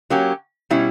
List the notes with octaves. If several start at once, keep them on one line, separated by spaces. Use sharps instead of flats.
F#3 A#3 C#4 G4
B2 G3 C#4 E4